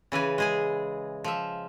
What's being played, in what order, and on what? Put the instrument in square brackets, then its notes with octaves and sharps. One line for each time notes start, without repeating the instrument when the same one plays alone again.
[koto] C#3 E3 B4 G#5
G#3 G#4 G#5
F3 E5